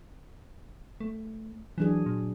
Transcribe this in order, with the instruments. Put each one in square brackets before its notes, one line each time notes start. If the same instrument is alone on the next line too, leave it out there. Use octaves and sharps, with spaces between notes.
[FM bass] A3
[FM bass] E3 [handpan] F#3 D4 G#4
[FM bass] A#2